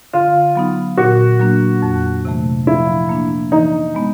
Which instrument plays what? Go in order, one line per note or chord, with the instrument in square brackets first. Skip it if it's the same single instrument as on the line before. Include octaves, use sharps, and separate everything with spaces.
[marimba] D3 [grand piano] F4
[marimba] F#3 B3 D#4
[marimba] A#2 [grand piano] F#4
[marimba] F#3 A#3 D4
F2
C3 E3 A3
[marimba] F3 [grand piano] E4
[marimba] A#3 D4
[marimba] E3 [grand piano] D#4
[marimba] G#3 B3